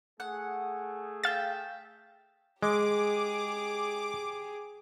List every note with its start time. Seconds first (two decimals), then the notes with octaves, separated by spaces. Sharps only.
0.20 A3 G#4 F#5
1.24 E5 F5 G5 A6
2.63 G#3 G4 G#4 D6